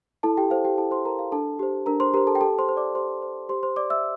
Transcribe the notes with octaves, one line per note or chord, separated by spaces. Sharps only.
E4 A4 A5
G4 G5
A4 C5 F5
G4 G5
E4 A4 A5
C5 C6
A4 A#4 C5 A#5
F5
D4 A4 A5
G4 C5
D4 A#4 A#5
C5 C6
G4 A#4 C5 A#5
A4 A5
G5
G4 A4 A5
C5 C6
C5
D5 D6
G4 C5 C6
C5
G4 C5 C6
C5 C6
D5 D6
E5 E6